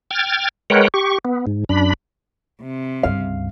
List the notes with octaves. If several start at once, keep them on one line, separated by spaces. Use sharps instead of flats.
G5 F6 G#6 A6
G#3 A#4 B4 C#5 F#5 G5
G4 C#6
B3
G#2
F#2 D4 B5
C3
C#2 G2 F5